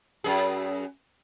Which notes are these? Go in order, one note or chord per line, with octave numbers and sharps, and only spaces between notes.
F#2 G#4